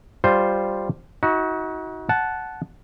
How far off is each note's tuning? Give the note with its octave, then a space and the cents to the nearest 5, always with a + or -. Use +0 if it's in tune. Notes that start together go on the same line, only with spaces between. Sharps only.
G3 +0 F4 +0 C5 +0
D#4 +40 F#4 +0
F#5 +0 A5 -15